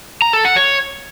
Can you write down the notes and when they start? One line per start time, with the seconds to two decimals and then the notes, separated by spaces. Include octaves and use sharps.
0.22 A#5
0.33 A4
0.45 F#5
0.56 C#5